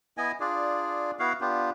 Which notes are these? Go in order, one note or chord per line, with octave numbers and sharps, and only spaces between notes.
B3 E4 D#5 G#5
D4 F4 G#4 D5
B3 E4 F#4 F5
B3 D4 F4 G4